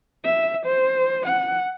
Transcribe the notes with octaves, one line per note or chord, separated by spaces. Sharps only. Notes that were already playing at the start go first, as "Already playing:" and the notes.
E5
C5
F#5